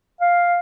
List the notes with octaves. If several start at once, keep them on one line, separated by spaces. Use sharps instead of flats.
F5